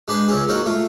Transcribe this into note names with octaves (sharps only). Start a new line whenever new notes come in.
G#3 D4 B4 C5
C#2 C4 C#4 G#4
F#3 A#3 C4 D#4 F#4 A#4
A3 F4